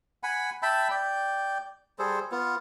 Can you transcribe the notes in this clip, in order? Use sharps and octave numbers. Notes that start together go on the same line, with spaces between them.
F#5 G#5 B5
E5 G5 A5 B5
D5 G5
G3 G#4 A4 C5
B3 F4